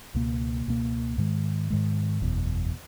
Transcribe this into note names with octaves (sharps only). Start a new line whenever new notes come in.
C#2 B2 A#3
C#2 B2 A#3
G#2 D#3 G#3
G#2 D#3 G#3
F#1 E2 B2